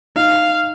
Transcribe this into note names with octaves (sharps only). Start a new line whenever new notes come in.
D#4 F5